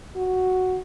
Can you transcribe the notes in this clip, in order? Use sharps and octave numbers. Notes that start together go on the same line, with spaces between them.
F#4